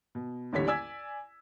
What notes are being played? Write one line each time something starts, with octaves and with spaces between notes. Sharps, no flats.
B2
A1 D#2 D3 G3 C#5 B6
D5 G#5 E6 G#6